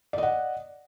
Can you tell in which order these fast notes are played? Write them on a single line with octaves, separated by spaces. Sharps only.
D5 D#5 F#5